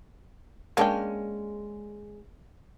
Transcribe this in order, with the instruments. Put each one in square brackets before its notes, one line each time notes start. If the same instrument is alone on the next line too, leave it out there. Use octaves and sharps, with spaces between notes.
[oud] G#3 C#4 [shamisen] A#3 D4 G5